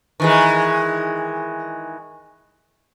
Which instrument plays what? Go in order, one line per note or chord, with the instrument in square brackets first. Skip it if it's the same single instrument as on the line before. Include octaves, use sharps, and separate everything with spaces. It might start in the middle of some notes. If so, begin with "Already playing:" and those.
[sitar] D#3 E3 G#3